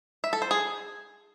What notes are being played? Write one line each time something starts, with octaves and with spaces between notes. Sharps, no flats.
E5
A4
C5
G#4